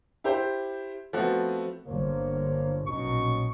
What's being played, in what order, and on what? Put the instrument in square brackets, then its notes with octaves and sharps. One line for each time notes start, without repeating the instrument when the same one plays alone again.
[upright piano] E4 G4 C5
F3 A3 B3 C4 F#4
[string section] G1 [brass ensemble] A#3 C5 C#5
[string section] A#1 B2 [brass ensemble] F#3 C#4 D#4 [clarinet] C#6